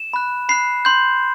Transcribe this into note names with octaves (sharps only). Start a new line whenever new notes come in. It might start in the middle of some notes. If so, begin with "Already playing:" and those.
Already playing: E7
B5 F#6
B5 F#6 C7
C6 G6